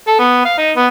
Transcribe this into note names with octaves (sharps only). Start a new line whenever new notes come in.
A4
B3
F5
D#4
B3